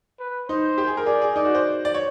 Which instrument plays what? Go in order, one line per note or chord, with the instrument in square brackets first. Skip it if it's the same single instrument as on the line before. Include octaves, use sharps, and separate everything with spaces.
[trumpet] B4
[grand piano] D#4 [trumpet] C5
[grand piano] G4
G#4
A#4
[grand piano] G#4 [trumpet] D5
[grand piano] G#4
[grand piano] D#4 [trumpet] D5
[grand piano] F#4
C5
D5
C#5